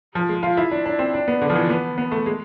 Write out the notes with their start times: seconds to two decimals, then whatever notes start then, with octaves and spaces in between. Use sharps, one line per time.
0.15 F3
0.29 G#3
0.43 F4
0.57 E4
0.71 D4
0.86 D4
0.99 C4
1.14 D4
1.28 B3
1.41 D3
1.50 F3
1.56 E3
1.70 B3
1.98 B3
2.11 A3
2.26 G#3